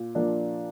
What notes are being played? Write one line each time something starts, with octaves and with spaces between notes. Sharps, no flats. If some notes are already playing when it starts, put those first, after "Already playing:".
Already playing: A#2
F3 A#3 D4